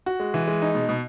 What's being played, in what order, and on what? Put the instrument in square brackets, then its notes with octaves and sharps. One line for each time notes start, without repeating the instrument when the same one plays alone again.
[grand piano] F#4
G#3
E3
G#3
D#4
B2
B2